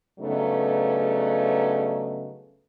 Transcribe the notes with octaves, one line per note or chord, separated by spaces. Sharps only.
G2 C#3 F#3 A3 B3 D#4